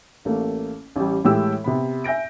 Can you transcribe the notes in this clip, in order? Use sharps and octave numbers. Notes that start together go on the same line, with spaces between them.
A1 A3 A#3
A1 G3
A2 E3 G#3 G4 G5 E6
C3 B3 B5
E5 G#5 G6 A#6 D7